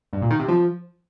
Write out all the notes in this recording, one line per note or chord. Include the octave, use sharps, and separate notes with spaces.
G2
A#2
D#3
C3
F3